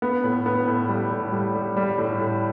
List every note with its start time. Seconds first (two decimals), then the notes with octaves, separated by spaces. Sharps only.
0.02 B3
0.23 A2
0.46 B3
0.67 A2
0.89 G3
1.11 A2
1.32 G3
1.55 G3
1.76 G3
1.98 A2
2.20 A2